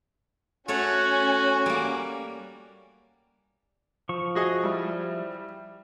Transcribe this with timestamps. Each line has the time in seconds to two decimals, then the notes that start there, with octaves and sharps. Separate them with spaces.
0.68 A3 C#4 F#4 A4 C#5 G#5
1.66 G3 A#3
4.09 F3 C#6
4.35 F#4 G#4 D#5
4.64 G3 E4